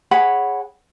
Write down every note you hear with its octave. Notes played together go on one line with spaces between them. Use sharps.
G#4 C#5 F#5 B5